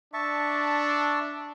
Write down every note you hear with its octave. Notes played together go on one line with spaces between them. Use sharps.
D4 E5 A5 C#6